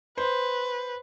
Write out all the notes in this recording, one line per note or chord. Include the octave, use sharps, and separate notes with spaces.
B4 C5